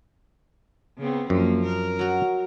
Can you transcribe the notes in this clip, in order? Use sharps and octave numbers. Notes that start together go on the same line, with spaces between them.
C#3 B3 C4
F#2 F3 A#3
A#4
F#3 F#4